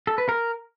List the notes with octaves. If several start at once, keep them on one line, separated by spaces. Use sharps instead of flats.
A4
B4
A#4